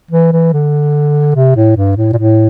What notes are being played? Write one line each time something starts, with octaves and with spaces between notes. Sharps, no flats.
E3
E3
D3
C3
A2
G2
A2
A#2
A2